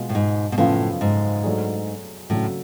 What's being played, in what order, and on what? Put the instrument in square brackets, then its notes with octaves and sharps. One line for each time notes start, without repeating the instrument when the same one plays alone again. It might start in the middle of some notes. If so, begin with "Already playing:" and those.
Already playing: [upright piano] B2 G#3 B3 F4
[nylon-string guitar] A2
G#2
B2
[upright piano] F#2 C#3 F3 B3 F4 [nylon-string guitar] A2
[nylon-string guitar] G#2
[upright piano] F#3 A3 D4 G#4
[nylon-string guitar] A2 [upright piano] C#3 F#3 A3 D4 F#4